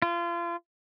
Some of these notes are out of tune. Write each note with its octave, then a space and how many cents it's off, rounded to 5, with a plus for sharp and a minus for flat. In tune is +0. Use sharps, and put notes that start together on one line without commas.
F4 -30